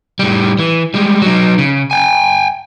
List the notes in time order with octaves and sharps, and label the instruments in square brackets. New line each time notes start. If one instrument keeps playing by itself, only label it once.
[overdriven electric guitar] A2 G3
E3
G3 G#3
F#3 D#4
C#3
G5 G#5